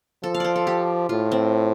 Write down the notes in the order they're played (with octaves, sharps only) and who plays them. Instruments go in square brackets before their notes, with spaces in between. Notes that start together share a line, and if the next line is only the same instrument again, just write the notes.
[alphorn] F3 [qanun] A4
[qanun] F5
C5 D5
A4
G4
[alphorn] A2 [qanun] F4
[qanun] C4